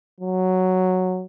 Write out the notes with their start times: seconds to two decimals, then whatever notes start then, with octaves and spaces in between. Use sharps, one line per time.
0.20 F#3